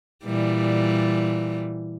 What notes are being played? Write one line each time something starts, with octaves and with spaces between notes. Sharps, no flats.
A#2 E3 G3